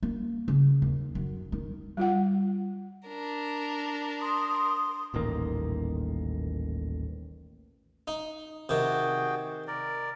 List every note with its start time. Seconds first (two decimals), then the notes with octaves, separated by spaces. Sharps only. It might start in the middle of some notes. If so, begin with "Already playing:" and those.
0.03 A#3
0.48 C#3
0.82 D#2
1.15 F#2
1.52 D#3
1.97 G3 F4 F#5
3.08 D4 A#4
4.20 C6 D#6
5.14 D#1 A1 D#3 A#3
8.08 D#4
8.69 C3 D#3 F#4 G#4 G5
9.67 A#4 D5